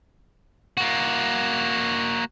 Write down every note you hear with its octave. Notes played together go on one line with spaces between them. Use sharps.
A#3 F#4